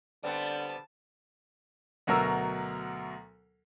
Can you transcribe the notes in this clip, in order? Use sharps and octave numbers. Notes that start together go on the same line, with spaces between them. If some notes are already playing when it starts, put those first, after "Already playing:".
D3 G3 B3 C4 D5 A5
D2 B2 F#3 A#4 E6